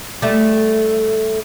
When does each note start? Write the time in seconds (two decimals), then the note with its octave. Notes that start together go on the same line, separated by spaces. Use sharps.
0.22 G3 A3